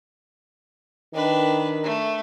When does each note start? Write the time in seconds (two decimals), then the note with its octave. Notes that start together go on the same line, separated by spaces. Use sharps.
1.14 D#3 D4 B4
1.84 A3